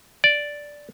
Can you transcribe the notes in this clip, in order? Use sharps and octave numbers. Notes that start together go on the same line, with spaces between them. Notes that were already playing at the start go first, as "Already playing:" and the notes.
D5